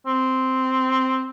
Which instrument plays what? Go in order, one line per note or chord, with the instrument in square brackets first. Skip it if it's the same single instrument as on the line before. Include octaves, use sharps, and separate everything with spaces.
[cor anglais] C4